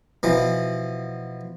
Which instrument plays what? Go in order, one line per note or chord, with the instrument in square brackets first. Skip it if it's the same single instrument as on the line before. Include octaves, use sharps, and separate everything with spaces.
[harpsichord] B2 E3 F3